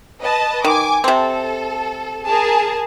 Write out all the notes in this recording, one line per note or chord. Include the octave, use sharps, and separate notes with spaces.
B4 D#5 A5
D#3 G#5 D6
C3 C4 A4
G#4 A#4 A5